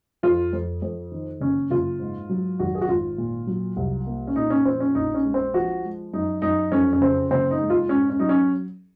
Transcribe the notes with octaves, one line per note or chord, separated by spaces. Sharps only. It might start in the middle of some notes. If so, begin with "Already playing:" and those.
F2 F4
F2
F2
D#3
F#1 C#4
F#1 F4
G#2
F#3
G#1 F#4
G#4
F#4
G#1 F4
A#2
F#3
C2
A#3
C#4
A#2 D#4
C#4
F3 C4
C#4
A#1 D#4
C#4
G#3
C4
F3 F#4
G#3
F#2 D#4
F#2 D#4
F2 C#4
C#4
C#3 C4
F#1 C4
D#4
G#3
F4
G#2 C#4
C#4
F#3 D#4
C#4